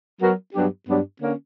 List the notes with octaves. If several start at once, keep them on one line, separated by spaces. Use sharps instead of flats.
F#3 B3 F#4 A#4
G2 F#3 B3 D4 G4
G2 F#3 B3 D4 G4
D3 A#3 C#4